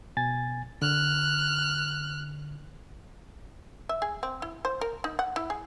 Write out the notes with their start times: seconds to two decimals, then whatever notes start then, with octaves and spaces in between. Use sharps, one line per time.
0.17 B2 G#5 A6
0.82 D3 F6 F#6
3.89 E5
4.02 G#4
4.23 C4
4.42 E4
4.65 C5
4.81 A#4
5.04 D#4
5.19 F#5
5.36 E4
5.50 G#4